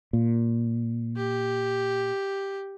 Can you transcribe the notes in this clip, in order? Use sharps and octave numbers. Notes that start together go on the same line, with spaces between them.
A#2
G4